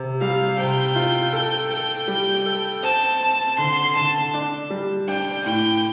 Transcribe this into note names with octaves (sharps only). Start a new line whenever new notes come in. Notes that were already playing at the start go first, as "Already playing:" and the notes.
Already playing: C3
G3 F5
C3 G5
F4
A4
A4
G3
A4
C4 A5
C4
D3 C6
D3 A5
D4
G3
D4 G5
A2 G5